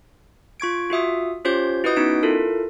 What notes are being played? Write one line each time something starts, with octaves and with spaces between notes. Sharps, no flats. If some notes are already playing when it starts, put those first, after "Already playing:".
F4 C#6 G#6 D7
F4 F#4 E5 D#6
C#4 F4 G4 C5 C#5 G6
E4 F#4 B4 D#5 D#6 G6
B3 C#4 D#4 B6 D7
E4 F4 A4 A#4